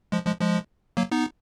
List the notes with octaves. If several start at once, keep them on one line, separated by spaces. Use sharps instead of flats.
F3 G#3
F3 G#3
F3 G#3
F#3 A#3
B3 D#4